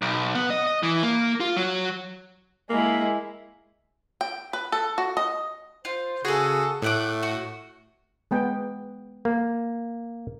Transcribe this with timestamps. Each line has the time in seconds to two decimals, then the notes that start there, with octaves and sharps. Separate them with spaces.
0.02 B1
0.35 B3
0.50 D#5
0.67 D#5
0.83 E3
1.03 A#3
1.40 F4
1.56 F#3
2.70 G#3 A#3 E4
4.21 G5
4.53 B4
4.72 A4
4.98 F#4
5.17 D#5
5.85 F4 C5
6.25 C#3 F#4 G#4 A4
6.82 A2 A3 E5 F#5 D6
7.23 F#4
8.31 G#3 B3 G5
9.25 A#3